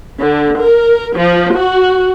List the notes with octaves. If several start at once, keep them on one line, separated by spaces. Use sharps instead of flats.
D3
A#4
F3
F#4